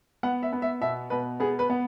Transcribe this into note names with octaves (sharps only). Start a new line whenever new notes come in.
B3 F#5
E5
B3
E5
B2 E5
B2 B4
B3 G#4
B4
B3